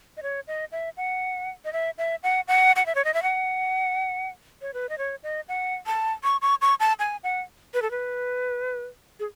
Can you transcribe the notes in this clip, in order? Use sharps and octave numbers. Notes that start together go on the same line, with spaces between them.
D#5
C#5
D#5
E5
F#5
D#5
E5
E5
F#5
F#5
F#5
E5
C#5
D#5
E5
F#5
C#5
B4
D#5
C#5
D#5
F#5
A5
C#6
C#6
C#6
A5
G#5
F#5
B4
A4
B4
G#4